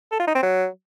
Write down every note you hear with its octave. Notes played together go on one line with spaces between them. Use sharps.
A4
F4
D#4
C4
F#3